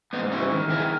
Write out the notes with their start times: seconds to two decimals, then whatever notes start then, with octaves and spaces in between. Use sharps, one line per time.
0.13 G#2 B3 D#4
0.31 G#2 C#4 E4
0.51 D#3
0.70 D#3 E4 G#4